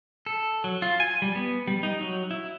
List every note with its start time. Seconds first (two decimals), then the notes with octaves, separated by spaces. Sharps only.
0.26 A4
0.64 F#3
0.82 F4
1.00 G#5
1.22 G3
1.35 B3
1.67 G3
1.83 D#4
2.01 F#3
2.31 E4